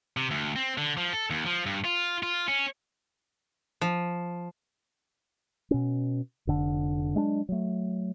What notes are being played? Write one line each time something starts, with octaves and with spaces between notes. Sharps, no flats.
C3
D2
C4
D3
F3
A4
D#2
F3
G2
F4
F4
C#4
F3
B2 C#4
F1 D3
F#3 G#3 C4 D4
F#3 A3